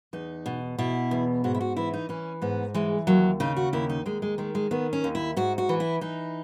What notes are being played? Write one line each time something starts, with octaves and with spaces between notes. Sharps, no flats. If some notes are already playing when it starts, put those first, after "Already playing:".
E2 D#4
B2
B2 E4
E2
G#2 F#4
E4
F#4
E3 E4
D#4
E3 C#4
G#2 B3
E3 G#3
D#2 F#3
C#3 D#4
F#4
D#2 E4
D#4
D#2 G#3
G#3
D#3 G#3
G#3
D#3 B3
C#4
D#2
E4
G#2 F#4
F#4
E3
E4
E3 D#4